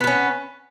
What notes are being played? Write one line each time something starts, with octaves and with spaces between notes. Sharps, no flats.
B3 C#4 B4